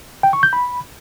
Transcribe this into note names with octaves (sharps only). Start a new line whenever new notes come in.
G5
C#6
G6
B5